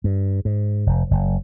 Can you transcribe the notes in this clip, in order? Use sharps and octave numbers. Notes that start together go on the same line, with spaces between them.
G2
G#2
F1
F#1